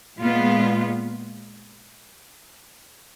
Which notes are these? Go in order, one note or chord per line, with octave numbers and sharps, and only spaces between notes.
A#2 G#3 B3 F4